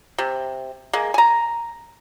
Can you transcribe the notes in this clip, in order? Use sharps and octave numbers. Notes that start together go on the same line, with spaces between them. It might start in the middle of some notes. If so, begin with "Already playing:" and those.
C3
G#3 A#3
G#5 A#5